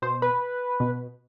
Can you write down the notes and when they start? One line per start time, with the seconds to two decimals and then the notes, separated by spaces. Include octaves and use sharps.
0.02 B2 C5
0.22 B4
0.80 B2